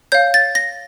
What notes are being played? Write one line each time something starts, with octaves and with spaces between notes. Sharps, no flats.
C#5 F5 G6
A6
A#6